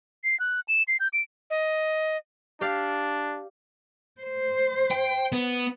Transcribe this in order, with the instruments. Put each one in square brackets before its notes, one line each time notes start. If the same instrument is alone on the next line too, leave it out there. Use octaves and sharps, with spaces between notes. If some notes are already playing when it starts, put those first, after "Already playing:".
[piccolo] C7
F#6
E7
C7
G6
D7
[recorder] D#5
[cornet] D4 [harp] G4 D5 F5
[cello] C5
[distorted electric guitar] G5
B3